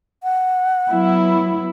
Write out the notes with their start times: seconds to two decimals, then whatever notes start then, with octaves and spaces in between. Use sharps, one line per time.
0.23 F#5
0.90 F#3 B3 E4